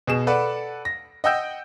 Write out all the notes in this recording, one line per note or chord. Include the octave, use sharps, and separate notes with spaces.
B2 G#4 E7
A4 B4 D5 F#5
A#6
D#5 F#5 G5 E6 G6